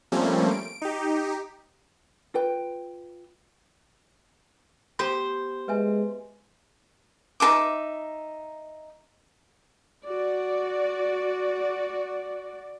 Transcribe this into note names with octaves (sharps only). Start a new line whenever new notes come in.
F3 G3 A3 A#3 C4 C#4
D7
D#4 G4
F4 B4 G5
B3 G4 C5
G#3 B4 E5 G#5
D#4 A#4 E5 D6
F#4 D5